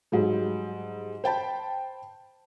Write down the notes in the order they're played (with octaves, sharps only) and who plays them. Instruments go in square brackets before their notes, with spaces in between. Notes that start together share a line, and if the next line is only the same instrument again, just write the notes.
[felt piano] G#2 F#3 G3
C5 G5 A5 B5